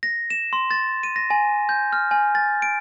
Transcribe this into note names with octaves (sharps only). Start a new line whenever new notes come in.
A#6
E7
C6
A6
D#7
A#6
G#5
G6
F6
G#5
A6
D7